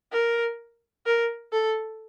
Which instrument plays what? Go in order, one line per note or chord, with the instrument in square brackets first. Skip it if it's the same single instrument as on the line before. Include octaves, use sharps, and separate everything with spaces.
[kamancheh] A#4
A#4
A4